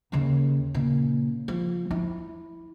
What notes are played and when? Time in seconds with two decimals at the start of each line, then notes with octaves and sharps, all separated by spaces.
0.12 D#2 C#3
0.74 A#2 C#3
1.48 F3
1.91 E4